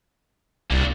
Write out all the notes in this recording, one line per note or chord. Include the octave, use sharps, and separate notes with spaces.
C2 A#3 D4